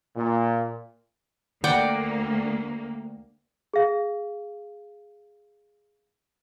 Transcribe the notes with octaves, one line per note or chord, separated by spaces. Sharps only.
A#2
D2 A#3 D5 F#5 G5
G#4 F5